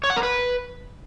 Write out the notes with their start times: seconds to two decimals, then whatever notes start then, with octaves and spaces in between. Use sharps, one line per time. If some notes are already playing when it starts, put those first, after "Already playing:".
0.04 C#5
0.10 F#5
0.16 A#4
0.23 B4